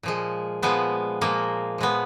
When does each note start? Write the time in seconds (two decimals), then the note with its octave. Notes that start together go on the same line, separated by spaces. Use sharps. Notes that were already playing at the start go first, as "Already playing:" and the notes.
0.03 A#2 F3 G#3
0.62 A#2 F3 G#3 B3
1.21 A#2 F3 G#3 A#3
1.78 A#2 F3 G#3 B3